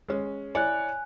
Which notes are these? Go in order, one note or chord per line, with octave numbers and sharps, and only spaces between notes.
G#3 C#4
E4 C#5 D5 G#5 F#6